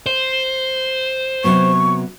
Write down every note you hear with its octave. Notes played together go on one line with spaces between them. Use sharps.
C5
C3 F#3 B3 C#6